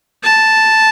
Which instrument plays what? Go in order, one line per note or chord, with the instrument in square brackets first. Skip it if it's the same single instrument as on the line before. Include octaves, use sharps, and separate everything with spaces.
[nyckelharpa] A5